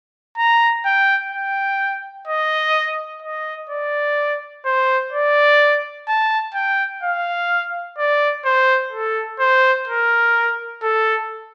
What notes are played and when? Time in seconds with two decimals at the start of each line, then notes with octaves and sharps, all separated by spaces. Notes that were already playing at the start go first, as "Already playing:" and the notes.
0.38 A#5
0.85 G5
1.32 G5
2.28 D#5
3.23 D#5
3.70 D5
4.65 C5
5.13 D5
6.08 A5
6.55 G5
7.03 F5
7.98 D5
8.45 C5
8.93 A4
9.40 C5
9.88 A#4
10.83 A4